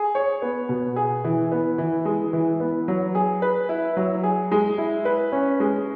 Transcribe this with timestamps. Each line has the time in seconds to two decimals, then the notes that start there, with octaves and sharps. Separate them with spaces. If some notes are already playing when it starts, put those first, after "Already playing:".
Already playing: G#4
0.15 C#5
0.42 B3
0.69 B2
0.96 G#4
1.24 E3
1.52 B3
1.78 E3
2.05 G#3
2.33 E3
2.60 B3
2.88 F#3
3.15 G#4
3.42 B4
3.69 E4
3.97 F#3
4.24 G#4
4.52 G#3
4.78 E4
5.05 B4
5.32 C#4
5.60 G#3